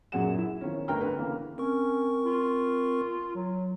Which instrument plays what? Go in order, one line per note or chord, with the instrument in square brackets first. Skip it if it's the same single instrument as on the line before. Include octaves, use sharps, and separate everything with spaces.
[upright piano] F#2 A#2 F#3 G#4 F#5 E7
E4
D#3 F3 C#4
G1 D2 A#4 G5 A#5 F6
D3 B4
C#3 E3 A#3
[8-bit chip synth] C4 A#4 C#6 [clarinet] C#4
[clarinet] F4
F#3